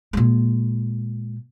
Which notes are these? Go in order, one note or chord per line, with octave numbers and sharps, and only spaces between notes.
A#2 G#3